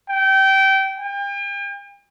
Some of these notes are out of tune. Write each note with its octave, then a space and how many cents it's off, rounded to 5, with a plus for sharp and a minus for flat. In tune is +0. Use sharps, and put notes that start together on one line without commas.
G5 -25
G5 +40